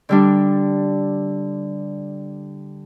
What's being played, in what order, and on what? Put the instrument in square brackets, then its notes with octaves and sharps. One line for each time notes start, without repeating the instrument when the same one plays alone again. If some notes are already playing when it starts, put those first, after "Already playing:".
[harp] D3 G3 D4